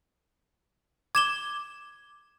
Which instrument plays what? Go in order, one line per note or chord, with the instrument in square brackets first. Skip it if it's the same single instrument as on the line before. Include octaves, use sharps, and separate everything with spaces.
[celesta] D6 [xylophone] G#6 E7 G7